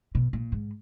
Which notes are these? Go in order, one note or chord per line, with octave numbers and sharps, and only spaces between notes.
B2
A#2
G#2